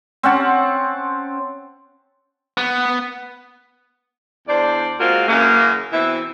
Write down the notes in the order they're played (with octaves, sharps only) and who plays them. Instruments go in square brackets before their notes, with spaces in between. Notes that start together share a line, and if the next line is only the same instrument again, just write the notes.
[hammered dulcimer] C4 C#4 F#5 A5
[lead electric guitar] B3
[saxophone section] E2 D4 C5 D5
G#3 A#3 C4 F4 F#4 A#4
F#2 C#3 E3 A#3
B2 E3 C4 E5